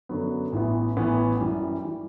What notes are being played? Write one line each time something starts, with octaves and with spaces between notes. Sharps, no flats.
F#2 D3 F#3 B3
A1 A2 E3 B3
A1 A2 E3 B3
F#2 E3 G3
E3 G3